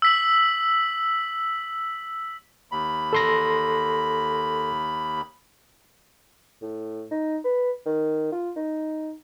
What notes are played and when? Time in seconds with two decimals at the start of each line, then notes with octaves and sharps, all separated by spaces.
0.02 E6 B6 F#7
2.72 D#2 B5
3.13 A4 C6 A#6
6.62 A2
7.11 D#4
7.45 B4
7.86 D#3
8.32 F4
8.56 D#4